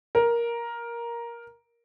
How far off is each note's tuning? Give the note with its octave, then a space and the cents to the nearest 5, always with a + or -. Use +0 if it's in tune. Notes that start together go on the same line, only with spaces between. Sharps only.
A#4 +10